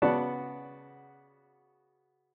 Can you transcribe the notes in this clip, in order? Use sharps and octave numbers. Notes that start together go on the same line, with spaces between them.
C#3 B3 F#4 D5 F#5 A5